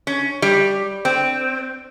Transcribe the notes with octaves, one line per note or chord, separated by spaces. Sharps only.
C#4
G3
C4